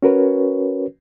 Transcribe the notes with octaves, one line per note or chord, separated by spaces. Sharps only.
C#4 F#4 A#4 B4 C#5